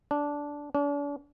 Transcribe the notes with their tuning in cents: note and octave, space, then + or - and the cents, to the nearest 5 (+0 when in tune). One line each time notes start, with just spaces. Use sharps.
D4 -10
D4 -40